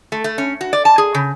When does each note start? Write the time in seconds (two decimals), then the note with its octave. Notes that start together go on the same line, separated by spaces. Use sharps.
0.12 A3
0.24 A3
0.38 C#4
0.61 F#4
0.73 D5
0.85 A5
0.98 G#4
1.15 C#3